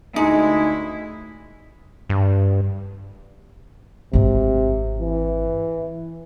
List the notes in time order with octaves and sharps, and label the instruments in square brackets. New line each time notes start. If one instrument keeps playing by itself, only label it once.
[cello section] D2 E4 [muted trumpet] G#3 [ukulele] D#4
[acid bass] G2
[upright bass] G#1 C4 [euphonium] C3
[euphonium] E3